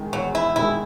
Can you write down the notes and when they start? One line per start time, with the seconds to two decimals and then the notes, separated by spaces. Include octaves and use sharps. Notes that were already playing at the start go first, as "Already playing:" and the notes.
Already playing: E2 D#3 G#3
0.12 E2 F#3
0.35 E4
0.56 D#3 G#3 E4